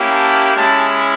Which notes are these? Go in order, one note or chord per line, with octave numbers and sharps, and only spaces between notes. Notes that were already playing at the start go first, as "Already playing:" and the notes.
Already playing: A#3 C#4 E4 G4
A5
G#3 C#4 E4 A5